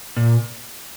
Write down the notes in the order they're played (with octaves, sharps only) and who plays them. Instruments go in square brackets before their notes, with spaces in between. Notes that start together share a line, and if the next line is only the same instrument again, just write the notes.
[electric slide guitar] A#2